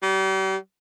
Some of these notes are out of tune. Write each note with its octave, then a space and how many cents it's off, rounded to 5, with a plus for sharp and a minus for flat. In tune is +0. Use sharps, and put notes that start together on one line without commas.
G3 -40